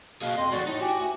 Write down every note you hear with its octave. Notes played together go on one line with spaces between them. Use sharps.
B2 A#3 G#4 F5
F2 D#5 C6
E2 A2 F#4 D5
A2 D#4
F#4 G4 G#5
D2